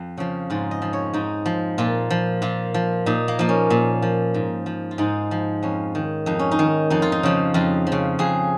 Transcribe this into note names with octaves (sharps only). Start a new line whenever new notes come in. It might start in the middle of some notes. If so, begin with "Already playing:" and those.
Already playing: F2
C#3 F3
G#2 F4
D#5
F3
C#5
G#2 D#4
F3
A#2 F4
F3
A#2 F4
F3
A#2 D#4
A#3
F3 A#3
C#4
A#2
F3
G#2
F3
F4
G#2 D#4
F3
F2 C#4
D#3
F2 D#4
C#4
D#4
D#3
F2 D#4
F4
D#4
C#3 F3
F2 F4
F3
C#3
F2 G#4